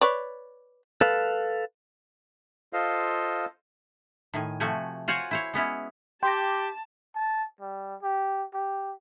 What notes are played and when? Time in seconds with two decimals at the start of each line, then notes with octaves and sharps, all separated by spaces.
0.01 B4 C#5 D5
1.01 A4 B4 F5
2.73 F4 A4 C5 D#5 F5
4.34 A2 D#3 G#5
4.60 C3 F3 A3 F#4 G#5
5.08 F4 F#4 C5 C#5 F#5 G#5
5.31 E4 C5 C#5
5.53 G#3 B3 C#4 E4
6.23 G4 G5 A5 C6 D6 A#6
7.15 A5
7.61 G3
8.02 G4
8.54 G4